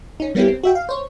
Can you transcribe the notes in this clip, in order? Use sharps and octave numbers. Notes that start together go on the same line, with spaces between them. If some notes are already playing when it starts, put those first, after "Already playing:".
C#4 D#4
G3 A#3 B3 C#4 E4 G4
C4
F#4 E5 G5
F5
C5 C#5